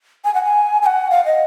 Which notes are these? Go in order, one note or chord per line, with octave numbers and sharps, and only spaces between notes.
G#5
F#5
G#5
G#5
F#5
F5
D#5